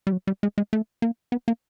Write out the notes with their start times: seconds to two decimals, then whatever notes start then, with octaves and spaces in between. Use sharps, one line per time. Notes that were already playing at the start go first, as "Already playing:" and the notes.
0.07 G3
0.12 F#3
0.27 G3
0.43 G#3
0.58 G#3
0.73 A3
1.02 A#3
1.32 B3
1.48 A#3